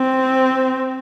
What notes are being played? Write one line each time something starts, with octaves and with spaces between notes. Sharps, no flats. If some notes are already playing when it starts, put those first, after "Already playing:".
Already playing: C4